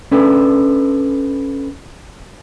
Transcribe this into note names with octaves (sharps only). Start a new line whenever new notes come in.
C#4 D4 A4 B4